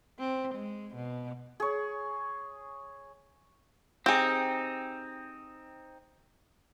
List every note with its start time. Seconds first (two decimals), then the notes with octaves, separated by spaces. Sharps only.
0.19 C4
0.55 G#3
0.96 B2
1.60 G#4 C#5
4.06 C4 D#4 G4 G#4